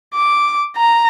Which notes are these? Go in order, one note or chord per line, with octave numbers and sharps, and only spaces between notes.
D6
A#5